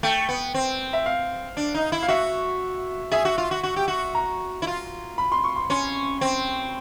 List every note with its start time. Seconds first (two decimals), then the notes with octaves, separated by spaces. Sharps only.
0.03 A3 G5
0.29 B3
0.54 C4
0.93 E5
1.06 F5
1.57 D4
1.74 D#4
1.92 E4
2.02 F5
2.08 F#4 E5
3.12 G#4 E5
3.25 F#4
3.38 F4
3.51 F#4
3.63 F#4
3.76 G4
3.88 F#4
4.15 A#5
4.62 E4
4.67 F4
5.18 B5
5.32 C6
5.44 C#6
5.56 C6
5.70 C#4 C6
6.21 C4